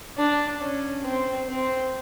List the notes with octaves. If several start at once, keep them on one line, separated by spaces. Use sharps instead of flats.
D4
C#4
C4
C4